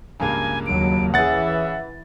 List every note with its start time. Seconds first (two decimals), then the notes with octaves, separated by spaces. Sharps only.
0.20 C#2 G2 A#3 G#5
0.66 D#2 F#3 D7
1.14 E3 C#4 G#4 E5 F#5 A6